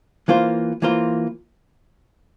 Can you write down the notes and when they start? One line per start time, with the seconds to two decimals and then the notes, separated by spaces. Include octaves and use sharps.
0.28 E3 A#3 F4 C5
0.82 E3 A#3 F4 C5